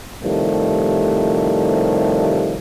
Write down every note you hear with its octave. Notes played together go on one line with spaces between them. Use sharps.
A2 C3 D#3 F3 G3 A3